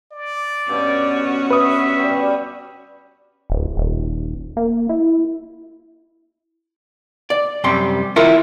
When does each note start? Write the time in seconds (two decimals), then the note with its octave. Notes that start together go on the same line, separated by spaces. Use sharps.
0.12 D5
0.69 G2 B2 C#4 F#4
1.51 B4 E5 D#6
1.99 G3 D5
3.50 D1
3.77 D#1
4.57 A#3
4.89 E4
7.30 D5
7.64 F#2 C3 G3 G4 C6
8.16 E4 F4 A4 A#4 E5